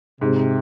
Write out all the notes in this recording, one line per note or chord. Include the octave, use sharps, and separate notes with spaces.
G#2 C3